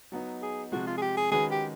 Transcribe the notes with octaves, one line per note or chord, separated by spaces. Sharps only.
F#3 B3 D#4
G#4
C3 F3 G#3 F#4
F4
G#4
G4
G#4
D#3 G#3 C#4 F#4 G#4 B4
G4